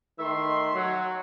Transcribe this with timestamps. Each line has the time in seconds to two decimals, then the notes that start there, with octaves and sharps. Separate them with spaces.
0.18 D#3 A3 E5 C6
0.74 F#3